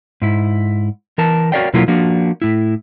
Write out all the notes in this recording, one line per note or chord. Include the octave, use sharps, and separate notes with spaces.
G#2 E4
E3 A#4 A5
F#4 A#4 C#5 D5 F5 G5
B2 F#3 A#3 E4 F4 A#4
F3 A#3 D4 F#4
A2 E4